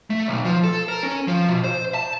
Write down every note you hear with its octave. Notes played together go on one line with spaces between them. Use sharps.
A3
B1
F3
A4
A#4
C#4
F3
B2
C5
A5